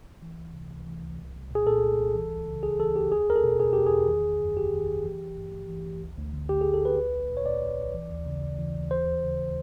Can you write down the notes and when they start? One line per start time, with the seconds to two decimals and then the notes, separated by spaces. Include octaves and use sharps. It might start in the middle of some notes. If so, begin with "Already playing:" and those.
0.22 E3
0.38 C#2
0.55 C3
0.71 C#2
0.87 E3
1.03 C#2
1.19 C2
1.35 C2
1.51 A#2 G#4
1.67 A#2 A4
1.83 C2
1.99 C2
2.15 E3
2.31 D2
2.48 C#3
2.63 D2 G#4
2.79 E3 A4
2.96 D2 G4
3.11 E2 G#4
3.28 E2 A#4
3.36 A4
3.44 B2
3.60 B2 G#4
3.73 E2 G4
3.86 G#4
3.92 E2
4.08 D#3
4.24 G1
4.41 F#2
4.56 G1 G4
4.73 D#3
4.88 G1
5.05 E3
5.21 G#1
5.37 G2
5.53 G#1
5.69 E3
5.85 G#1
6.01 D2
6.17 D2
6.33 D3
6.49 D3 G4
6.61 G#4
6.66 D2
6.74 A4
6.82 D2 B4
6.97 B1
7.14 B1
7.30 A#2
7.37 C#5
7.46 A#2 D5
7.62 B1
7.78 B1
7.94 E3
8.10 D#2
8.26 C#3
8.42 D#2
8.58 E3
8.75 D#2
8.91 E3 C5
9.07 D2
9.23 C#3